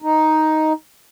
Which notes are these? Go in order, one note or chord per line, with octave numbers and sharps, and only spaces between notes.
D#4